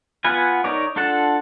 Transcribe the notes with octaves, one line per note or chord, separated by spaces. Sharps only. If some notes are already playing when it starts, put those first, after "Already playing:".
B3 F4 B4 F#5 G#5
D#4 A#4 C#5 D5
D4 F4 A4 F#5 A5